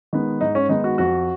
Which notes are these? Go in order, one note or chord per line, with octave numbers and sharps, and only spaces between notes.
D#3 G#3 B3
G#2 D#4
C#4
D#3 G#3 B3 D#4
F#4
F2 F#4